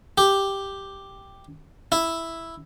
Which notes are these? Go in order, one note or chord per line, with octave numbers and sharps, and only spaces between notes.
G4
E4